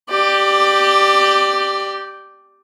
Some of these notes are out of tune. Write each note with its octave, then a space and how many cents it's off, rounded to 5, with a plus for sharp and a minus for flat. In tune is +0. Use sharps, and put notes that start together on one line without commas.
G4 -5 D5 +20